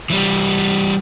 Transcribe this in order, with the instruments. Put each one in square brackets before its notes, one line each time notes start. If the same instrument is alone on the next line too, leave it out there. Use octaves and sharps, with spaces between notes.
[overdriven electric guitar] E3 G3